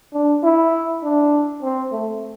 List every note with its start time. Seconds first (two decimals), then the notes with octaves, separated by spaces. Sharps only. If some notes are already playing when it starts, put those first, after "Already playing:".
0.13 D4
0.43 E4
1.03 D4
1.62 C4
1.92 A3